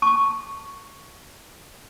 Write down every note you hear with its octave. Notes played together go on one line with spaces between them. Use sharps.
A5 C#6